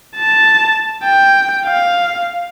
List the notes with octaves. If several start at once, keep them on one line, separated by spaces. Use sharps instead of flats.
A5
G5
F5